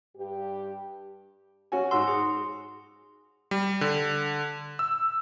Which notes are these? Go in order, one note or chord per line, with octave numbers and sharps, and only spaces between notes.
G2 G4
C#4 F#4 G#5
G#2 F#4 C6 E6
G#4
G3
D3
E6